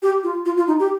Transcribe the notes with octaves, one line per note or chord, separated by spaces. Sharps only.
G4
F4
F4
F4
D#4
G4